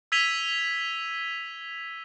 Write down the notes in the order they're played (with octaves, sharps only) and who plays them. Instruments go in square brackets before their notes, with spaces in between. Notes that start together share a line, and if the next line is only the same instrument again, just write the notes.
[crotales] E6 G#6 B6 D#7 F7 G7